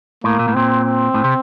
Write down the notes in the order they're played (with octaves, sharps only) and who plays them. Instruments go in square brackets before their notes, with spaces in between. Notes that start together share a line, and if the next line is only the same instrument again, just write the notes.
[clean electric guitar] A2 [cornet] A#3
[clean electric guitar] A#2
A2
[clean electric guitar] A#2 [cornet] C4
[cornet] C4
[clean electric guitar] A2
C3